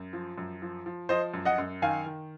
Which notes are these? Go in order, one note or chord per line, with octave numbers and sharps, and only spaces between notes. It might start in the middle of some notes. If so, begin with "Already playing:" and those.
Already playing: F#2
F3
F#2
F3
F3
F3 C5 D#5
F#2
D#5 F#5
F#2
D#3 F5 G#5
D#3